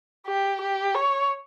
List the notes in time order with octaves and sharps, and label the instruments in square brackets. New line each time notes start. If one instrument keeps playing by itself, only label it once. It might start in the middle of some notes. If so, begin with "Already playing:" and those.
[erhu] G4
G4
C#5